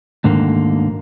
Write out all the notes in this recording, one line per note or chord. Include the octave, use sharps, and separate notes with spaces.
D2 G#2 D3 D#3 A#3